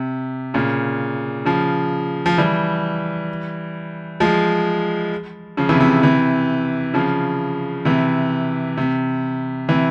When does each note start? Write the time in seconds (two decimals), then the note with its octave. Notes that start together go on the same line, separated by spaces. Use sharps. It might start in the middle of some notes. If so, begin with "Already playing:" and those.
Already playing: C3
0.54 A#2 C#3
1.45 C#3 F3
2.26 F3
2.38 E3 G3
4.20 F3 G#3
5.57 C#3 F3
5.69 C3 E3
5.80 C3
6.03 C3 E3
6.94 C#3 F3
7.85 C3 E3
8.78 C3
9.69 C3 E3